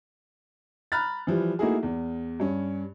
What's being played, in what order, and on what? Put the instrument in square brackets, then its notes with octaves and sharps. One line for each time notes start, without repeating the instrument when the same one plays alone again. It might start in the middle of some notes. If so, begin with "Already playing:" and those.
[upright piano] A#5 B5 F6 F#6 A6
E3 F3 G3
A3 A#3 D#4 E4 F#4 G#4
E2
G2 C#4